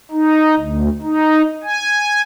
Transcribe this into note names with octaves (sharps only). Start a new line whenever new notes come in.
D#4
D2
D#4
G#5